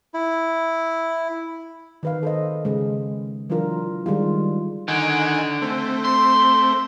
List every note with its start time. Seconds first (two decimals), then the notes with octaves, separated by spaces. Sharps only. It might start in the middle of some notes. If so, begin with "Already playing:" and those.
0.14 E4
2.03 D#3 B4 F5
2.23 A4 C5 D#5
2.65 C#3 G#3
3.50 E3 F#3 D4 F4 A#4
4.06 D#3 G3 G#3 F4
4.88 D3 D#3 F#5 G#5
5.62 A3 C4
6.05 C6